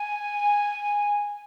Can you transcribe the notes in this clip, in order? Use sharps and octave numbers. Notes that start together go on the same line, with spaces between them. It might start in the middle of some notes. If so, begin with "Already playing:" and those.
Already playing: G#5